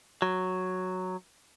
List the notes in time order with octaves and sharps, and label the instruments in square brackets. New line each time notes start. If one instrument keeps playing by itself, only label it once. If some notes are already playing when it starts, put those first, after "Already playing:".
[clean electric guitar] F#3